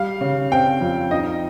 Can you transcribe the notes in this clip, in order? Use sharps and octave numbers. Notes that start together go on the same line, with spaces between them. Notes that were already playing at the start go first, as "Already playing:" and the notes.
Already playing: G3 F5
C#3
C4 G5
F2
D#4 D#5